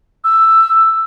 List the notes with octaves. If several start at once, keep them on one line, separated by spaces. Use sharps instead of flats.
E6